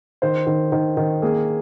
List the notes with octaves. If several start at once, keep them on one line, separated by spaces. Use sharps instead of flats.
D#3 C5
D#3
D#3
D#3
A#3 G#4